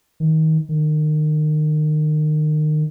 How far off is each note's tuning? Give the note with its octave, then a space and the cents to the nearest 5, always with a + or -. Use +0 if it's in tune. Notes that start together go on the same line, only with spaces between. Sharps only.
D#3 +25
D#3 -30